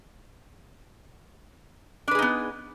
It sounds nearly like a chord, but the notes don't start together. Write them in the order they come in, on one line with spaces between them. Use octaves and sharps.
D4 B4 G#4 D#4 B3